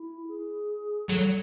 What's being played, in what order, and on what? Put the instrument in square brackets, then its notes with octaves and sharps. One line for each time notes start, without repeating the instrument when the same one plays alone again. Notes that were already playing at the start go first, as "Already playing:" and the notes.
Already playing: [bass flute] E4
G#4
[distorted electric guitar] F#3 [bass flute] A4